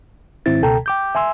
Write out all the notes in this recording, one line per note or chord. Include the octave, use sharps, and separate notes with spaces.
G#2 D#3 C4 E4 A6
C#2 B2 A4 G5 A5 A#5
G5 D6 G6
E5 G#5 C6 E6